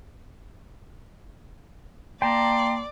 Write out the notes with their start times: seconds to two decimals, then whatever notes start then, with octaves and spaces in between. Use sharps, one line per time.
2.22 A#3 D5 G5 A5 A#5 C6